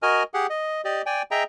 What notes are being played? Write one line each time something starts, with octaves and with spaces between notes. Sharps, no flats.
F#4 A#4 D#5 G#5 F6
G4 G#4 F#5
D#5
G4 D5 D#5
D5 G5 G#5
G#4 D#5 E5 G5 A#5